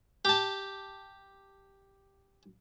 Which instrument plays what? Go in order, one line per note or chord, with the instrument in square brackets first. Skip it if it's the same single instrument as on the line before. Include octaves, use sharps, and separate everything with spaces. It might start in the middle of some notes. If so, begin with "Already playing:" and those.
[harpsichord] G4 A5